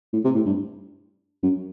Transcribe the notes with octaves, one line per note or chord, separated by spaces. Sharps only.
A2
C3
A2
G2
F#2